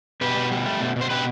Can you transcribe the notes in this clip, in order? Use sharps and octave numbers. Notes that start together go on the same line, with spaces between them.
B2 G4 B4
B2
G3
A3
B2
B2
C5
B2 G4 B4